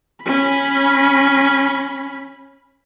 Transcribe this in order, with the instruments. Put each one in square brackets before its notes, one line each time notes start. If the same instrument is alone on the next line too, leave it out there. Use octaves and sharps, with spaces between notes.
[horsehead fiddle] C#4 B5